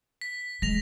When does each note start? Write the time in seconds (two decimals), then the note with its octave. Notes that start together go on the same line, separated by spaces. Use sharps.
0.21 B6
0.62 G#3 A#6 F7